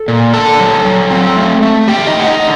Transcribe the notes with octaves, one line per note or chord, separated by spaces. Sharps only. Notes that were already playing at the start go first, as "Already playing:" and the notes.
Already playing: A4
A#2
D3 A4 A5
F#3
F#3
C4
A3
A3
D3 G4 G5
D#4 D#5
D3
F#5
D#4 D#5
D3